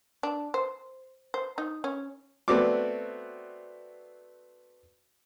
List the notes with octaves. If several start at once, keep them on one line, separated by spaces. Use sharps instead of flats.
D4
C5
C5
D#4
C#4
A3 B3 C4 F#4 D5 D6